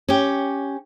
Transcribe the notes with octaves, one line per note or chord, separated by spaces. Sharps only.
C#4 G4